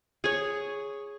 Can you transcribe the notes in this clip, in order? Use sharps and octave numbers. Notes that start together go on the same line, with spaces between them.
G#4 C#5